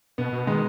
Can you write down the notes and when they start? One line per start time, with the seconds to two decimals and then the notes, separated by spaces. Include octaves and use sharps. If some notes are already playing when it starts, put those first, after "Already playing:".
0.18 B2 B3
0.33 B2
0.47 D#3 G#3